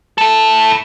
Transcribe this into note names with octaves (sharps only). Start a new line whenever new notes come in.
E4 A4